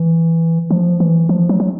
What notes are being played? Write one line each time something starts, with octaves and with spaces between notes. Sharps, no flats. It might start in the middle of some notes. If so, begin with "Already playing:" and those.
Already playing: E3
F3
E3
F3
F#3
F#3